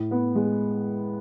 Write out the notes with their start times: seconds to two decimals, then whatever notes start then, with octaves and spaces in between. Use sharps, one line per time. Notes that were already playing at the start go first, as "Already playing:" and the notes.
Already playing: A2
0.11 B3
0.36 G#3